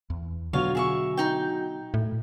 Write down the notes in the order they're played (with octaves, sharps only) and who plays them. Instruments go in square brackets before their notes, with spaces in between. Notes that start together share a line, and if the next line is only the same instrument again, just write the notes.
[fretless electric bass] E2
[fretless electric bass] B2 B3 [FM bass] D3 [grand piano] F#3 [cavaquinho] F4 C#5 F5
[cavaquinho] G#4 E5 C#6
D#4 G5
[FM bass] A2